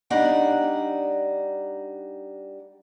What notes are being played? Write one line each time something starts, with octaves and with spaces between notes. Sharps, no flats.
G3 D4 D#4 F#5